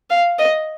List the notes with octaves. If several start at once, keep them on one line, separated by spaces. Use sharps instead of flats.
F5
D#5